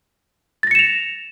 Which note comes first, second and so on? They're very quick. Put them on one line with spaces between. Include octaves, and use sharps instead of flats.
A6 A#6 C#7 E7 F7